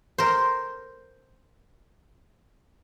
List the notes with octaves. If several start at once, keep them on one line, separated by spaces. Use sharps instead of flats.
A#4 C5